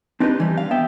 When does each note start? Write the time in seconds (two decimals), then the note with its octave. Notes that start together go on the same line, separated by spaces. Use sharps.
0.20 C4 D4 D#4 G4 B4
0.40 E3 G3
0.58 F5
0.71 B3 E5 G5